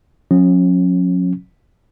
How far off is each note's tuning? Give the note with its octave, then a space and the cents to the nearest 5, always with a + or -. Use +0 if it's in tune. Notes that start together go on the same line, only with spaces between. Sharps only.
F#3 -45 C#4 -25